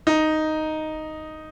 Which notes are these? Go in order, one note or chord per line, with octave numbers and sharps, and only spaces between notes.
D#4